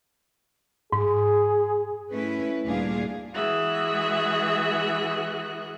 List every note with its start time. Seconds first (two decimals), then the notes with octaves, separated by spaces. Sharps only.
0.93 G#2 G#4
2.13 A3 C#4 E4 B4
2.65 D2 A#2 G3 D4 G#4 F5
3.33 E3 G#3 F#4 G#4 E5 F#6